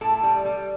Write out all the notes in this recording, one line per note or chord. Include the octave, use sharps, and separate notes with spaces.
A2 A4
G3
G3